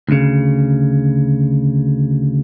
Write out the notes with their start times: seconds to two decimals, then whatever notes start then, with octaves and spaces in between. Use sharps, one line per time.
0.09 D2 C#3